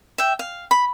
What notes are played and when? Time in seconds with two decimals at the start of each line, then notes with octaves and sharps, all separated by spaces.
0.18 E5 G5
0.39 F5
0.71 B5